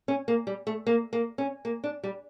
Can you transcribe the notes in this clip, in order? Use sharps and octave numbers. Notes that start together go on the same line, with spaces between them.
C#4
A#3
G3
A3
A#3
A#3
C#4
A#3
D4
G3